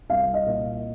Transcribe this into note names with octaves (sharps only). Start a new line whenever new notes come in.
C2 F5
D#5
A#2